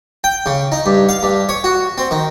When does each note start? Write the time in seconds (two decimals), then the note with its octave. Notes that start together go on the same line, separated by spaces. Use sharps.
0.24 G5
0.46 C#3
0.72 D#4
0.86 G2
1.09 F5
1.23 G2
1.49 C#5
1.64 F#4
1.98 C4
2.11 D#3